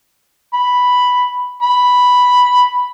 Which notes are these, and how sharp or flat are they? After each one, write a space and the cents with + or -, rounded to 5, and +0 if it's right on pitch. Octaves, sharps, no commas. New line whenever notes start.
B5 +0
B5 +0